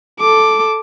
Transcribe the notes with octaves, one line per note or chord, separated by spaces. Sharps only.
A4 D6